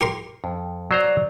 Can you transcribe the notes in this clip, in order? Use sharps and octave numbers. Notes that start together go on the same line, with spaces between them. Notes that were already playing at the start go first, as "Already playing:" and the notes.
G4 A#4 C6
F2
F#3 C5 D5 A#5